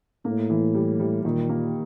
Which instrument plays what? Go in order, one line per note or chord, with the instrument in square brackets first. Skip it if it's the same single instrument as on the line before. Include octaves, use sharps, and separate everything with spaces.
[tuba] A2 [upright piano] A#3
[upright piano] E3
G3
G3
[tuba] A#2 [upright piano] D#3
[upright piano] A#3